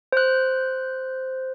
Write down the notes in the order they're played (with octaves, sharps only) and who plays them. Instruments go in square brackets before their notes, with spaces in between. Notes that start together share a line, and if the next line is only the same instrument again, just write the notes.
[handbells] C5 F#6